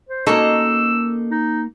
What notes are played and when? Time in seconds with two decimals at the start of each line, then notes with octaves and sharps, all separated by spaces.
0.09 C5
0.27 A#3 C#4 D#4 F#4 A4 E6
1.31 D#4